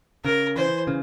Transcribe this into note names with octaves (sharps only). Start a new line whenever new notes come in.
C#3 A#4
E3 C5
C#3